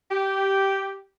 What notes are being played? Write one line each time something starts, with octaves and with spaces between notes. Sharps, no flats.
G4